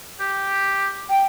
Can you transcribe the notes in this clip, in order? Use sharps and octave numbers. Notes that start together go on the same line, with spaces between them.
G4
G5